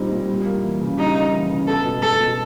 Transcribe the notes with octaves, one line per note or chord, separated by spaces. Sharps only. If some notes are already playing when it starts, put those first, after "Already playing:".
Already playing: A#2 G3 C4 D#4
A#2
G3
A#3
E3
C#3
G3 D#4
A#3
E3
C#3
B3 A4
B2
G#3 A4
B2